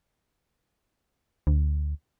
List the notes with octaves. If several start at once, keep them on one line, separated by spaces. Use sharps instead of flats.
D2